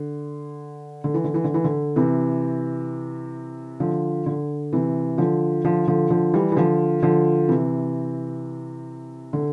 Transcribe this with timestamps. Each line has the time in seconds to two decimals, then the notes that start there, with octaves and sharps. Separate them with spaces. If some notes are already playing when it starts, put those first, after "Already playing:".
Already playing: D3
1.04 D3
1.14 E3
1.24 D3
1.34 E3
1.44 D3
1.54 E3
1.64 D3
1.96 C3 E3
3.80 D3 F3
4.26 D3
4.73 C3 E3
5.18 D3 F3
5.64 D3 F3
5.87 D3 F3
6.10 D3 F3
6.34 E3 G3
6.52 E3
6.56 D3 F3
7.02 D3 F3
7.48 C3 E3
9.33 D3